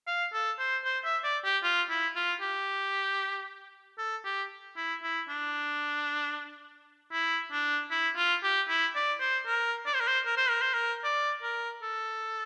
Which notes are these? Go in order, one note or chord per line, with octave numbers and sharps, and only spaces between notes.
F5
A4
C5
C5
E5
D5
G4
F4
E4
F4
G4
A4
G4
E4
E4
D4
E4
D4
E4
F4
G4
E4
D5
C5
A#4
D5
C5
A#4
C5
A#4
C5
A#4
C5
A#4
D5
A#4
A4